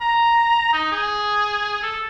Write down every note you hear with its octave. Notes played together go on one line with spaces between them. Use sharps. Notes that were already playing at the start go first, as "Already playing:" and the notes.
A#5
D#4
G#4
A4